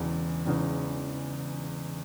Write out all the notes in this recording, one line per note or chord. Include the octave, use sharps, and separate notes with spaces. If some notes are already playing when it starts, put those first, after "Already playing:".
Already playing: E1 E2 C#3
E1 E2 C#3